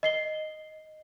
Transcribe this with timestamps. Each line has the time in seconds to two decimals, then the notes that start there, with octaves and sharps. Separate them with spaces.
0.03 D#5 C7 G7